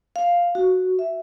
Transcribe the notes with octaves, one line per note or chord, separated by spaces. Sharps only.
F5
F#4
E5